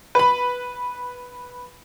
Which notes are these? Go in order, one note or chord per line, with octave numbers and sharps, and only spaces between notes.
B4 B5